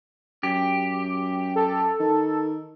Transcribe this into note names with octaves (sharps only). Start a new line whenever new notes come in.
F#2 G4
A4
D#3